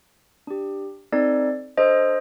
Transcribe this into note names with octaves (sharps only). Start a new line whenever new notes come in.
D4 G4
C4 D#4 A4 D5
D4 A4 C5 D#5